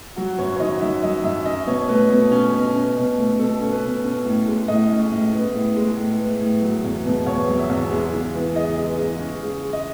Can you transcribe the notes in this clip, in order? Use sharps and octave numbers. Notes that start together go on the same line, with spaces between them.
F#3 F#4
F#2 C#5
C#5
D#3 D#5
F#2 E5
F#3 D#5
F#2 E5
C#4 D#5
B2 C#5
A3 B4
B2
C#4
B2
C#4
B2
A3
B2 A4
C#4
B4
B2
C#4
A2
G#3
A2 D#5
C#4
A2
B3
A2
G#3
A2
B3
A2
F#3
E2
B2
E2 C#5
F#3
E5
E2
G#3
C#3
E3
B3 D#5
G#3
C#3
C#4
C#3
G#3
D#5